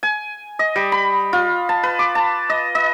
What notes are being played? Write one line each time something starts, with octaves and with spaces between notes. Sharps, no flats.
G#5
D#5
G3
B5
F4
A5
B4
D6
A5
D#5
D#5